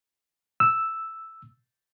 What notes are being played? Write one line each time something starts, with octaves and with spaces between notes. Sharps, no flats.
E6